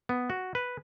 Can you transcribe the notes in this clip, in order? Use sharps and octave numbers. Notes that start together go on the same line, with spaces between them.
B3
F#4
B4